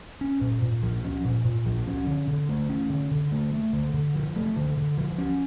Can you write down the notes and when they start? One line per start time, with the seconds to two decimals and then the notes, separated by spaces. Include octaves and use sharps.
0.21 C#4
0.41 A#2
0.62 A#2
0.83 F3
1.04 C#4
1.25 A#2
1.45 A#2
1.66 F3
1.87 C#4
2.07 D3
2.28 D3
2.49 A3
2.69 C#4
2.90 D3
3.12 D3
3.32 A3
3.53 A3
3.73 D3
3.94 D3
4.15 F3
4.35 A3
4.56 D3
4.78 D3
4.98 F3
5.18 C#4